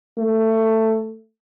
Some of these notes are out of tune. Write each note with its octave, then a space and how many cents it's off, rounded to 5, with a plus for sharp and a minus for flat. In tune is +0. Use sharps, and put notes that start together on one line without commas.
A3 +15